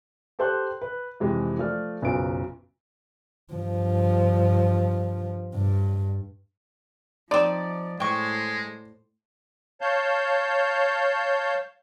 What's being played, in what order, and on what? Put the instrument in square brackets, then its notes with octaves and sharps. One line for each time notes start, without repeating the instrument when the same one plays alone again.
[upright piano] G4 A4 C5 G5 C6 F#6
B4
F2 C3 E3 G#3
F3 A3 D5 F6
F#1 B1 F#2 F4 B4 D7
[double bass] G2 F3
G2
[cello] F3 [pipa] C4 D#4 [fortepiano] D5
[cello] A2 C5 [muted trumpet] G#3 [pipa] G5 C#6
[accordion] C#5 F5 A5 G6